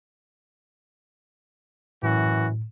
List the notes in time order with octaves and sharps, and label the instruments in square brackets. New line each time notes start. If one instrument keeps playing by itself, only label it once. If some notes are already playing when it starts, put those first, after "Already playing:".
[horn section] F#2 E3 F#4 [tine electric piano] A2